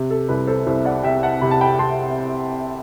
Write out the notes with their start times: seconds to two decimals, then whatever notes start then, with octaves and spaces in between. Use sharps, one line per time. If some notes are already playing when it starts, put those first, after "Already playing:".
Already playing: C3
0.11 A4
0.29 C2 B4
0.47 A4 C5
0.66 C2 C5 E5
0.85 D5 F#5
1.03 C3 E5 G5
1.22 F#5 A5
1.41 C3 B5
1.51 A5
1.61 G5 B5
1.79 C3 A5 C6